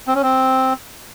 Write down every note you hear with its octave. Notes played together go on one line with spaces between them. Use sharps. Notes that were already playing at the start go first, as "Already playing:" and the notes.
C4
C#4
C4